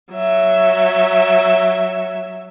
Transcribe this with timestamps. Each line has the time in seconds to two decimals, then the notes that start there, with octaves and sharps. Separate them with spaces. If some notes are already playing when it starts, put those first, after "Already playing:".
0.12 F#3 E5